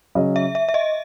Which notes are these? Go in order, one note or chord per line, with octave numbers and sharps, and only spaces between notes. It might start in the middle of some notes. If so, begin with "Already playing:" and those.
C#3 F#3 C#4 G#4 D#5
E5
E5
E5
D#5